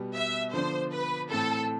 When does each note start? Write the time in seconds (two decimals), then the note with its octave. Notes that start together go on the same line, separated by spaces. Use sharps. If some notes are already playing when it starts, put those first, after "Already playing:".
Already playing: B2 G3 B3
0.14 E5
0.53 D3 F3 B3 D4 C5
0.92 B4
1.30 A2 E3 A3 C4 A4